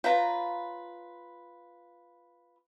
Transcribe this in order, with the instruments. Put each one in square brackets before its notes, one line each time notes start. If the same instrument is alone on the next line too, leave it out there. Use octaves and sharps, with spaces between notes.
[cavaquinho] F4 B4 A#5 [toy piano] C#5 F5